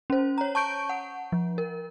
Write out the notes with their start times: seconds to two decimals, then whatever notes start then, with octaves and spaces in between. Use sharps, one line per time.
0.10 C#4 C5
0.38 C#5 A#5
0.55 A5 C#6 G6 D7
0.89 F#5
1.32 F3
1.58 A#4